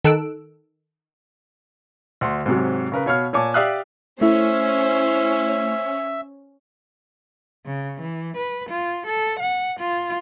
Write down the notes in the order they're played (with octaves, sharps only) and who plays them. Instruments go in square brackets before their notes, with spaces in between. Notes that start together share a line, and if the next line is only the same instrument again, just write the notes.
[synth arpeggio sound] D#3 A4 E6 F#6 D7
[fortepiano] D2 F#5 C6
G#2 C3 F#3
C#3 A#4 B4
B2 C#5 F5 F6
A#2 C#5 G#5 A5 D6
G4 D5 E5 F5 D#6 F#6
[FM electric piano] A3 E4 [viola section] C#4 [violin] C5 [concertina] E5
[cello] C#3
E3
B4
F4
A4
F#5
F4